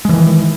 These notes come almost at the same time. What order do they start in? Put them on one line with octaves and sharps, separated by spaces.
G#3 E3 D#3